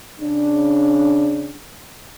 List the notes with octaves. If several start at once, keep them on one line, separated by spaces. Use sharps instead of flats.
C#3 D4